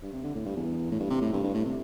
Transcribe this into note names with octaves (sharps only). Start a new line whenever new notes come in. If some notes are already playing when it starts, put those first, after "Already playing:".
G2
C3
D3
A2
G2
E2
A2
G2
C3
A2
G2
G2
A2
C3